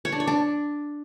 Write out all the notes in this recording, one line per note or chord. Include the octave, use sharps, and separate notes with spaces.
C#5
D4
C#5
D4